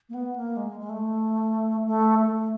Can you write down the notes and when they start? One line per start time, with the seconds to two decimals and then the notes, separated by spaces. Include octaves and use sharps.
0.09 A#3
0.14 B3
0.36 A#3
0.57 G#3
0.80 G#3
0.89 A3
1.86 A3
2.19 A3